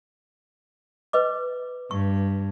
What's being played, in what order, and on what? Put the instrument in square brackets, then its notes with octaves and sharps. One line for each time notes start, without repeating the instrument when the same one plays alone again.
[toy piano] B4 D#5 D6
[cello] G2 [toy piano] C#6